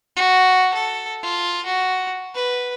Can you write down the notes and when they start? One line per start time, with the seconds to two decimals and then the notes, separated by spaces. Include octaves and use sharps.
0.17 F#4
0.74 A4
1.23 F4
1.66 F#4
2.35 B4